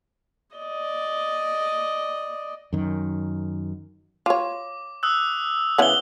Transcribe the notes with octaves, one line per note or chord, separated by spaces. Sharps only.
D5 D#5
F#2 D#3
F4 C#5 D6
D#6 E6 F#6
C#3 E3 B3 F#7 G7